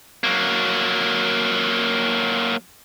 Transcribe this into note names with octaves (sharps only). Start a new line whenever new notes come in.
F#3 A#3